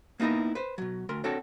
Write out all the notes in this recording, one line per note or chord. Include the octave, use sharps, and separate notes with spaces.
A#3 B3 D#4 E4 A#4
B4 C5
B2 F#3
D2 A#4 C6
C4 D4 F#4 A4 A#4 C#5